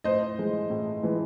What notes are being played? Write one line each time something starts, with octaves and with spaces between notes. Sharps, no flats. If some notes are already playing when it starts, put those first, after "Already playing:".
A2 C5 D#5
E3 G#3
A2
E3 G#3